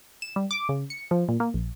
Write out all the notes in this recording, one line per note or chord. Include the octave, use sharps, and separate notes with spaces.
E7
G3
D6
C#3
C#7
F3
A#2
A#3
A#1